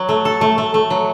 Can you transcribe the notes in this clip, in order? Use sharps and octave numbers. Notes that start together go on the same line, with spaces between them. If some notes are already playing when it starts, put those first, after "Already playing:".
Already playing: F#3
A3
A4
A3
A3
A3
F#3